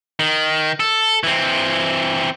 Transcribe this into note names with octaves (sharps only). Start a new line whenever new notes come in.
D#3
A4
E3 C4